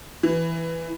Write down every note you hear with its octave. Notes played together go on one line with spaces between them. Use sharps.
E3